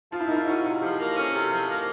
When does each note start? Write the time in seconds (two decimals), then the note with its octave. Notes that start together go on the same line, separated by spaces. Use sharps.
0.12 F3 F4
0.20 E4
0.28 A#3 D#4
0.36 E4
0.47 C#4 F#4
0.65 C3
0.82 F3 G4
0.99 A#3
1.16 C#4 A4
1.34 C3
1.52 F3
1.69 A#3